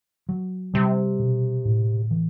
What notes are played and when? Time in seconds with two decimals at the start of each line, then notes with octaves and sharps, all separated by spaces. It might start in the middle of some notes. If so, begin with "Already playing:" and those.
0.29 F#3
0.74 C3 G3
1.19 B2
1.65 A2
2.11 E3